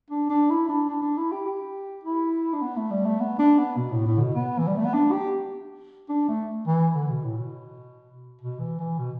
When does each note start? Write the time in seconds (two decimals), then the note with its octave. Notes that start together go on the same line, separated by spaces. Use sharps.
0.10 D4
0.30 D4
0.50 E4
0.69 D4
0.89 D4
1.02 D4
1.17 E4
1.32 G4
1.46 G4
2.04 E4
2.53 D4
2.62 B3
2.77 A3
2.91 G3
3.05 A3
3.20 B3
3.39 D4
3.59 B3
3.77 B2
3.92 A2
4.06 A2
4.17 D3
4.20 B2
4.35 B3
4.59 E3
4.67 G3
4.77 A3
4.85 B3
4.94 D4
5.12 G4
6.09 D4
6.28 A3
6.67 E3
6.95 D3
7.10 B2
7.24 A2
7.37 B2
8.41 B2
8.60 E3
8.79 E3
8.98 B2